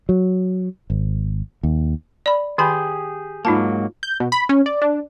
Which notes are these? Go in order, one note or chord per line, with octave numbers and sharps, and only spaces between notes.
F#3
G#1
D#2
D5 B5
D#3 G4 G#4 G#5 B5
G#2 F#3 A#3 D#4 F4 A5
G6
B2
B5
C#4
D5
D4